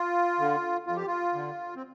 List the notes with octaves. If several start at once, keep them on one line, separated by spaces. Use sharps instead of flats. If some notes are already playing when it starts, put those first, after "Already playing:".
Already playing: F4
D3
F2 F4
G4
F4
D3
C4